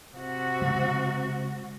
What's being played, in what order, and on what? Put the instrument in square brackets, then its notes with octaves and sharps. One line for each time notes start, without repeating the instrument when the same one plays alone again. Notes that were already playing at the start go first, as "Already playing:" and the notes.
[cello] C3 F#4
[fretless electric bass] C#3 G#3 C4